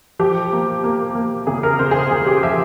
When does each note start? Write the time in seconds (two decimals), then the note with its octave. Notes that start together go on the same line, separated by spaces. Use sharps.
0.19 F3 G4
0.52 A#3
0.84 A#3
1.15 A#3
1.47 C#3 G#4
1.63 A#4
1.79 C#3 C5
1.91 G#4
1.95 A#4
2.11 C#3 G#4
2.26 G4
2.43 F3 E5